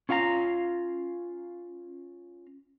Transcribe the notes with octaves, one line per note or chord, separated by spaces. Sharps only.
C#4 F4 F5 F#5 A#5